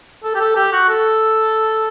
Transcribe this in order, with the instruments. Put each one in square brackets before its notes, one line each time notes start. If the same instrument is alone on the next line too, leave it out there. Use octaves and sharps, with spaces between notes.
[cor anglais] A4
G4
A4
G4
F#4
A4